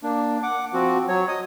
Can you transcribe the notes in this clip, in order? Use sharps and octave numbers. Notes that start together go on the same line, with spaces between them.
A#3 D4
F#5 D6
F3 C4 F#4
F#3 C#5
D#5 D#6